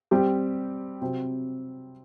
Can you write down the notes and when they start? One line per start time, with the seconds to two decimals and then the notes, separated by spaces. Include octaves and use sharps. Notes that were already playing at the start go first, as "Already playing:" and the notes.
0.11 G3 C4 G4
1.01 C3 F#3 C4